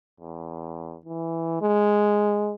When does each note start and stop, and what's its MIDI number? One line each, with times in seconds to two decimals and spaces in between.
0.20 0.96 40
1.06 1.61 52
1.62 2.55 56